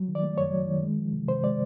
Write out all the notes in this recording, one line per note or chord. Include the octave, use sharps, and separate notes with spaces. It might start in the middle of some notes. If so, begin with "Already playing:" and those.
Already playing: F#3 G3
D#3
D5
A3
F#2 C#5
F#3
D#3
G#3
F3
C3
C3 C5
G#3 D5